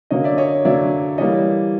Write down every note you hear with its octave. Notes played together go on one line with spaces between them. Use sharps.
D3 F#3 A#3 C#5 D#5
D5 E5
C#5 D#5
D3 F#3 A#3 D5 E5
E3 G3 A#3 C#5 D#5